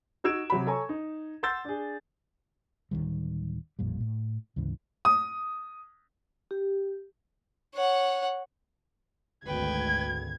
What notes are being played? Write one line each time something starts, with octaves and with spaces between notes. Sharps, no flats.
D#4 F#4 E6 G#6 D7 E7
C3 F#3 F#5 B5
A4 C#5 G#5 A#5 C#6
D#4
F#5 C6 E6 G6 A6
D4 G#4
D1 A#1 D#3 G3
A1 F2 A#2 G3
A2
D2 G#2 C#3 E3
D#6
G4
C#5 F#5
G#1 D2 B4 G5 G#6